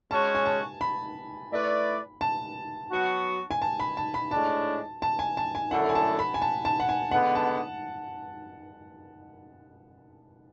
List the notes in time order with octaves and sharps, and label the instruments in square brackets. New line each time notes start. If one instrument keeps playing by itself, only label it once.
[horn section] G#3 C#4 F#4 C#5 [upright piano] A5
[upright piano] G#5
A5
B5
[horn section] A3 E4 B4 D5
[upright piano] A5
[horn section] F#3 B3 F#4
[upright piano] G#5
A5
B5
A5
B5
[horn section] A2 G#3 D4 [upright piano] A5
[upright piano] A5
G#5
A5
G#5
[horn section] F#2 D3 A3 E4 A4 [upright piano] F#5
[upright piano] G#5
A5
B5
G#5
A5
A5
F#5
G#5
[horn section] D3 G#3 B3 [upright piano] F#5
[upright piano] A5